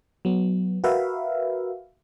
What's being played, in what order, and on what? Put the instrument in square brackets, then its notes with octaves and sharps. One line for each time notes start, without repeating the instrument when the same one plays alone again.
[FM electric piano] F#3 B3
F#4 A#4 B4 E5 F5